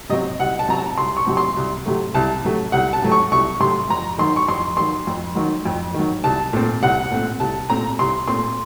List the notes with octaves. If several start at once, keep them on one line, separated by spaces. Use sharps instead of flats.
C3 F#3 C4 D#5
C2 F#5
A5
C3 F#3 C4 A#5
A5
C2 C6
C#6
C3 F#3 C4
C6
C2
C3 F#3 A3
C2 A5
C3 F#3 A3
C2 F#5
A5
C3 F#3 A3
C#6
C2 C#6
C3 F#3 A3 C6
F2 A#5
D#3 F#3 C6
C#6
F2 C6
D#3 F#3 C6
F2
D#3 F#3
F2
D#3 F#3
C2 A5
A#2 A3 C4
C2 F#5
A#2 A3 C4
C2 A5
A#2 A3 C4 A#5
C2 C6
A#2 A3 C4 C6